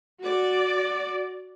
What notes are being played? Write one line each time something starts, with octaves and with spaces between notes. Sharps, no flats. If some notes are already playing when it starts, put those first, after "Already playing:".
F#4 D5